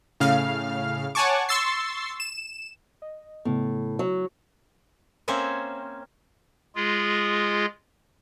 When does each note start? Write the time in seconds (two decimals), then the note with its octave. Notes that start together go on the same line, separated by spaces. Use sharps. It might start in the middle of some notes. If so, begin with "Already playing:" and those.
0.20 A2 C#3 F5 F6
1.15 C#5 F#5 G#5 A5 C#6 D6
1.49 C6 C#6 E6 A6 C7
2.20 E7
3.02 D#5
3.45 A2 C#3 A3 B3
3.99 F#3
5.28 A#3 C4 C#4 C5 C#5 E5
6.75 G#3 F4 G#4